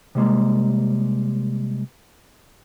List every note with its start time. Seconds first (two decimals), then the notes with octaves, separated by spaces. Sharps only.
0.15 C3 G3 G#3 A#3